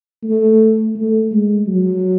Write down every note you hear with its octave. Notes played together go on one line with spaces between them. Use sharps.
A3
A3
G#3
F#3